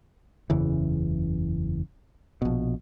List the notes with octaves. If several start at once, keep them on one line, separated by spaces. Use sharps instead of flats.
F#1 E2 C#3 E3
A#1 B2